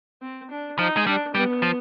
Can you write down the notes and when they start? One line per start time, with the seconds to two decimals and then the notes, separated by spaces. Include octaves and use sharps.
0.22 C4
0.50 D4
0.78 F3 D#4
0.97 G#3
1.06 G3 D4
1.34 G3 B3
1.62 F3